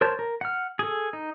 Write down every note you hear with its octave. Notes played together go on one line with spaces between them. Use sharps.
A#4 C5 C#5 A5
A#4
F#5 F6
G#4 A4
D#4